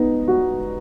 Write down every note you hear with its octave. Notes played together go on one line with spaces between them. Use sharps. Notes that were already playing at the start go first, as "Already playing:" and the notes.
Already playing: B3 D#4
F#4